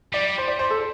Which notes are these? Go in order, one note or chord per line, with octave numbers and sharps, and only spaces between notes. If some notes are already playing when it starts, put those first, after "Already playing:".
G3 D5
C5
D5
C5
A4